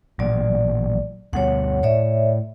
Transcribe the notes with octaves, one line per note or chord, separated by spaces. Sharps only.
A1 A#2 F#3 D5
D2 B2 G3 C#5 F#5
A2 C#5 D5 E5